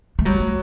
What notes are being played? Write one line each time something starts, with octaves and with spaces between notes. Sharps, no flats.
A3
F#3 G3
A3